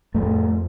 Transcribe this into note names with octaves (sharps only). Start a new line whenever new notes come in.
F2 A2 A3